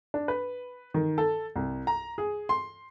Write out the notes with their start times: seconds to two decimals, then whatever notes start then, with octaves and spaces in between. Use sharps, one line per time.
0.14 D4
0.28 B4
0.94 D#3
1.18 A4
1.56 C2
1.87 A#5
2.18 G#4
2.49 C6